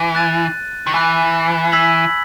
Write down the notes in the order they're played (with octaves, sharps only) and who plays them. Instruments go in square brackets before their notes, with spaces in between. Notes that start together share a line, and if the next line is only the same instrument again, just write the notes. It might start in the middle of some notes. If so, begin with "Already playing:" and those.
Already playing: [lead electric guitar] E3
[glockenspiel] F#6 A6 D#7
[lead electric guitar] D#3
[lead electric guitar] E3 [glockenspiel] G#5 B5 F#6
[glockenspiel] E6 G#6 B6 F#7